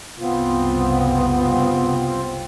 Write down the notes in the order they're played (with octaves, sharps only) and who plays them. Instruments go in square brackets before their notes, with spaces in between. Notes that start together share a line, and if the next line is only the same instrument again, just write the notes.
[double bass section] F#1 C2 [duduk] B3 [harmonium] C4 F4